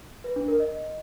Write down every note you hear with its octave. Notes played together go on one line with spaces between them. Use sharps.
B4
D4
A#4
D#5